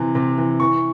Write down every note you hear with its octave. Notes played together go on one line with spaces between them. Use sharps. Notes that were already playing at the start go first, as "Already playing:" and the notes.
Already playing: C3 E3
C3
E3
E3 C#6